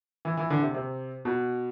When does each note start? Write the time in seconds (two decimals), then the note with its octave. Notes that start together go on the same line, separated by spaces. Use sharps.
0.25 E3
0.37 E3
0.50 D3
0.62 C3
0.74 C3
1.25 B2